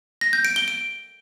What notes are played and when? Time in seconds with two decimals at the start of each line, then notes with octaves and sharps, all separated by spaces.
0.21 A#6
0.33 G6
0.45 D7
0.56 G7
0.68 D7